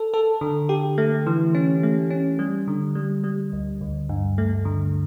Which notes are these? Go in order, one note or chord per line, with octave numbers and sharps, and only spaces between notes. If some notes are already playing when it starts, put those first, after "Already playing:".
Already playing: A4
A4
D3
G4
A3
E3
C#4
A3
C#4
G3
D3
G3
G3
D2
D2
G2
A3
D3